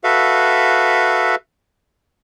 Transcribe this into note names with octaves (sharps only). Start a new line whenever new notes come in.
F#4 A4 B4 E5 F5